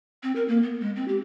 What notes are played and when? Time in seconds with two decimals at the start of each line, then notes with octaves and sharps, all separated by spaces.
0.23 C4
0.36 A#4
0.48 A#3
0.63 B3
0.81 G#3
0.96 C4
1.08 G4